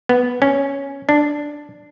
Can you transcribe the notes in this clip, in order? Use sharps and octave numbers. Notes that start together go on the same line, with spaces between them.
B3
C#4
D4